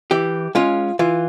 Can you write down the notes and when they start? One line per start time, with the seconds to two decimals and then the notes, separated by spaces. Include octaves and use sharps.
0.11 E3 G4
0.55 G#3 C#4 F4
0.99 E3 F4